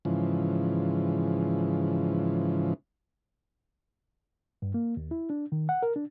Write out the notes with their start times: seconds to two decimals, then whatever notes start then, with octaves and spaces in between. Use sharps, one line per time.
0.05 G#2 C#3 E3 F3
4.62 G2
4.74 A#3
4.97 D#2
5.11 E4
5.30 D4
5.52 D#3
5.69 F#5
5.83 A#4
5.96 D4